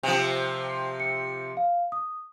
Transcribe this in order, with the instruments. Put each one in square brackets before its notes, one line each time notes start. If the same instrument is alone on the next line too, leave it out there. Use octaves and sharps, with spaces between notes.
[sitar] C3 F3
[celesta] C#7
F5
D#6